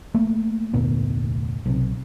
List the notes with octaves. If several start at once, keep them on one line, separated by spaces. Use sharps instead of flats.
A3 A#3
F1 D2 A#2 B3
B1 C3